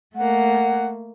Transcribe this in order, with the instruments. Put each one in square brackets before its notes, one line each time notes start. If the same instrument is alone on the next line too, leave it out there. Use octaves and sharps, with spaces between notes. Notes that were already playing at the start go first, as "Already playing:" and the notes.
[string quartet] A3 A#3 [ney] F#5